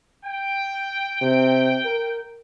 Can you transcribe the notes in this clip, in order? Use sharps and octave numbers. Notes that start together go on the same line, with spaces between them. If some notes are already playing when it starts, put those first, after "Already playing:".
G5
C3
A#4